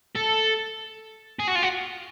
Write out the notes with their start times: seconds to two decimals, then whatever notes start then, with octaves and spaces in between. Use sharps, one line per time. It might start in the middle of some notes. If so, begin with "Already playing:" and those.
0.16 A4
1.39 G#4
1.47 F#4
1.55 F4
1.62 F#4